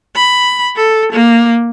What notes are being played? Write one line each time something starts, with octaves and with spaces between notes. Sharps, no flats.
B5
A4
A#3